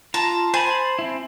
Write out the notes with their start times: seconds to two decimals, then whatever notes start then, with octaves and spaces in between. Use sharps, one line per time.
0.14 F4 A5 A#5
0.54 C5 G#5 A5 B5
0.99 C4 E4